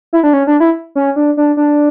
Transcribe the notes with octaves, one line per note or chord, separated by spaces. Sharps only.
E4
D4
C#4
D4
E4
C#4
D4
D4
D4